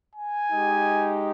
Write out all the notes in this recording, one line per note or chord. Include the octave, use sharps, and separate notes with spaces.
G#5
G#3 D#4 G4